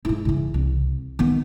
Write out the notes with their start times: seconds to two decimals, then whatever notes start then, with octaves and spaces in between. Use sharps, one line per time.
0.05 G#2 E4
0.25 C#3 E3
0.54 C2
1.19 D#3 B3